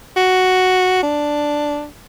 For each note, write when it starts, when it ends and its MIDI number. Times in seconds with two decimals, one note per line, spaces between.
0.16 1.02 66
1.03 1.85 62